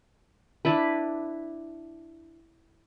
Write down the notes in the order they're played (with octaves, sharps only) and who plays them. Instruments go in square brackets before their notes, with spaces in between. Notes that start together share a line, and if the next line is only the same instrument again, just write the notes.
[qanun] D4 E4 B4